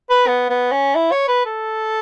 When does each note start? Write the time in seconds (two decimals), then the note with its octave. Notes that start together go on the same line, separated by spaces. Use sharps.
0.10 B4
0.27 B3
0.50 B3
0.72 C#4
0.95 E4
1.11 C#5
1.28 B4
1.45 A4